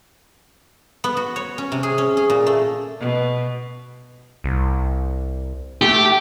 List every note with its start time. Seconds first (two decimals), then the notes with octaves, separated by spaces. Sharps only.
1.04 B3
1.17 F#4
1.36 C#5
1.58 C#4
1.72 C3
1.83 G#4
1.98 C#4
2.17 G#4
2.30 A#2
2.47 A3
3.00 B2
4.44 C2
5.82 A3 G4